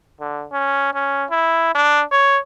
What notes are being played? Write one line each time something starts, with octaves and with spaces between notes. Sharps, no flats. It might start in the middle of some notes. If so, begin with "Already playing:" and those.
D3
C#4
C#4
E4
D4
C#5